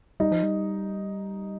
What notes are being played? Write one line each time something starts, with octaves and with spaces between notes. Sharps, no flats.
G3 D#4
F3
G3